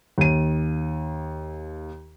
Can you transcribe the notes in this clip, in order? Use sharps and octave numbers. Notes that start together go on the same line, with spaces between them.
D#2 D#7